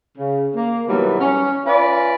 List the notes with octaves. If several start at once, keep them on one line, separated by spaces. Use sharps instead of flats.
C#3
A#3
B2 D#3 E3 F#3 G3
C#4
C#4 F4 B4 D5 E5